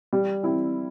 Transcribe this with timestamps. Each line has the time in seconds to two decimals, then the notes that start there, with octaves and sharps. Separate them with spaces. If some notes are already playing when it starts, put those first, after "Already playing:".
0.13 G3
0.43 C4 E4